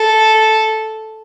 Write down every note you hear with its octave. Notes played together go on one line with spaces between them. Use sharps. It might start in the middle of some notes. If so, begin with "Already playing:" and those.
Already playing: A4